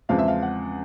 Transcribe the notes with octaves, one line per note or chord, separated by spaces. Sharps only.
E2 C#3 F3 G#3 C4 F5
E5
F5
F#5